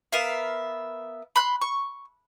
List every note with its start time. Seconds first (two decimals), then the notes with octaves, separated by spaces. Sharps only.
0.12 B3 A#4 E5 F5
1.36 B5 C6 F#6
1.62 C#6